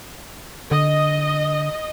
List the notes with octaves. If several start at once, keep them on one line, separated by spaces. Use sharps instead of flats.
D3 D#5